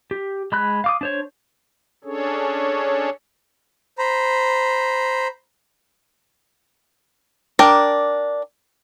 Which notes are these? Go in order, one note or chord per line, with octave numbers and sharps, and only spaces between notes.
G4
G#3 B5 F#6
F5 D6 D#6
D4 C5 C#5
C#4 D4 G#4 A4 C#5
C5 A#5 B5
D4 A#4 G5